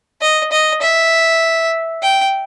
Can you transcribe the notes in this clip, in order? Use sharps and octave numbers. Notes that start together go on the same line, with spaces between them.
D#5
D#5
E5
G5